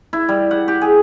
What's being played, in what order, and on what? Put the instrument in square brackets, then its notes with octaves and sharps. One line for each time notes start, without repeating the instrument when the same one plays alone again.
[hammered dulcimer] E4
G3
F#5
G4
G#4